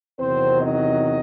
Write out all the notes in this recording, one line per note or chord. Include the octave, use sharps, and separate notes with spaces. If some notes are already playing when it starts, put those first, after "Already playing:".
E2 C3 D#3 F#3 C4 C5
D#4 D#5